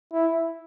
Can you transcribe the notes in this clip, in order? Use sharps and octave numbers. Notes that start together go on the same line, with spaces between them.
E4